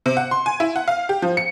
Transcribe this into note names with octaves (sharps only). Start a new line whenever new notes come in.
C3
F#5
C6
G#5
E4
F#5
F5
G4
F3
C#7